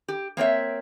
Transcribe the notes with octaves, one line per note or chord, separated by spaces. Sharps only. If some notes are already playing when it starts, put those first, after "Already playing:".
G4
A#3 C4 C#5 E5